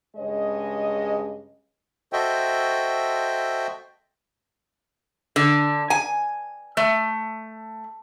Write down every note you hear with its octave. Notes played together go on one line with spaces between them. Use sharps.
G2 C#3 G#3 C#5 D#5
F#4 A4 C5 D#5 E5 G5
D3
G#5
A3